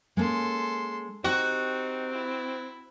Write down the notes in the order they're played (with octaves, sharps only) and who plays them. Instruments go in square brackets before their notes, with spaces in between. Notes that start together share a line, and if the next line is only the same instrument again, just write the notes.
[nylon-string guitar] G#3 A#3 C#4 [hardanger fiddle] A4 C6
[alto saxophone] C4 [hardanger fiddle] D#4 [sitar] F#4 [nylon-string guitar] G4 G5
[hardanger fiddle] E4